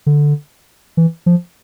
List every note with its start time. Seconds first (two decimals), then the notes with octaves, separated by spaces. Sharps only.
0.06 D3
0.97 E3
1.26 F3